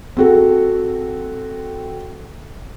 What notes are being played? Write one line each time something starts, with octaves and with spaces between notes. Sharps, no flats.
C4 F#4 A4